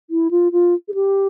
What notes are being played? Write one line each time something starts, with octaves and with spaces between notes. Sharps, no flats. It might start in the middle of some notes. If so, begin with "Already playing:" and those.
E4
F4
F4
G#4
G4